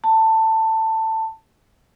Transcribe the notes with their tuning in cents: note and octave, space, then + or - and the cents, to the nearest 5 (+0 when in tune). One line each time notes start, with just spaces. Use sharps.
A5 +15